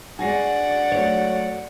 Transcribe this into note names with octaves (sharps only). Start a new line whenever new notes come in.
G#3 D4 F#4 D5 F#5 G#5 A#6 C7
F#3 A3 C#5